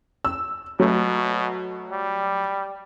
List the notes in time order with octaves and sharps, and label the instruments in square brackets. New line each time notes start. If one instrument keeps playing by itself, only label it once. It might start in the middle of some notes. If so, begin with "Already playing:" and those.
[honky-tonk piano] E6
[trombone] B2 [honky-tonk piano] F#3 A3
[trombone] G3